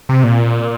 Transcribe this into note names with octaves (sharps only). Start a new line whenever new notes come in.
C3
A#2